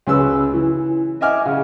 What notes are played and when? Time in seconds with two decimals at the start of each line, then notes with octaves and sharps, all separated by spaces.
0.07 C#2 C#4 B4 E6
0.54 E3
1.21 D#5 E5 F#5 G#5 D6 F6
1.46 C#3